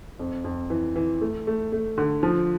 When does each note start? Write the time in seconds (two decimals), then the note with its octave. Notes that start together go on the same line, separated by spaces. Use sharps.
0.19 F2
0.44 F2
0.70 E3
0.96 E3
1.21 A3
1.47 A3
1.72 A3
1.98 D3
2.23 F3